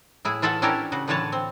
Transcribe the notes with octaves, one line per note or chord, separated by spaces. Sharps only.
A2 E4 G#4
E3 F4 A4 E5 F#5
C#4 D4 E4 G4 A4 A#4
C#3 F#4
A2 D3 E3 B4 C#5 A5
C4